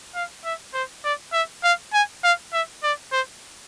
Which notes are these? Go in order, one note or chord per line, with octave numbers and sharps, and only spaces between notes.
F5
E5
C5
D5
E5
F5
G#5
F5
E5
D5
C5